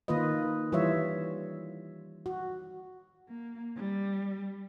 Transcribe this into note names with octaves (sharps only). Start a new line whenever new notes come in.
D#3 A#3 F4 B4 D#5
E3 G3 F4 C#5 E5
F#4
A#3
G3